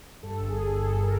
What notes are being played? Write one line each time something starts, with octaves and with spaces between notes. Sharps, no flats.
G2 A4
G1
G#4
G2
G1 A4
G2
A#4